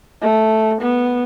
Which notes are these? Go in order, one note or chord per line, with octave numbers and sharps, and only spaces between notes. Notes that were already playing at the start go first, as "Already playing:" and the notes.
A3
B3